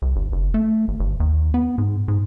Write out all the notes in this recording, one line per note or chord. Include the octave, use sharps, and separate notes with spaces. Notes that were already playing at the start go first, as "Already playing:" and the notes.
C2
G1
F#1
A3
G#1
G1
D#2
B3
G#2
G#2